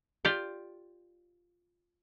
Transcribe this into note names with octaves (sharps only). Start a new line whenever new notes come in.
F4 G4 D5 G5